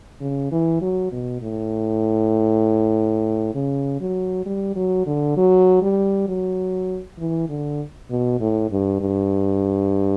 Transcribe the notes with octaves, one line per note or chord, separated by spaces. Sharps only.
C#3
E3
F#3
B2
A2
C#3
F#3
G3
F#3
D3
F#3
G3
F#3
E3
D3
B2
A2
G2
G2